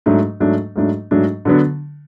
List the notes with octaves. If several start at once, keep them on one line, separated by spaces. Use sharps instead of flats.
G#2 F#3 A3 D4
G#2 F#3 A3 D4
G#2 F#3 A3 D4
G#2 F#3 A3 D4
D3 F#3 B3 D4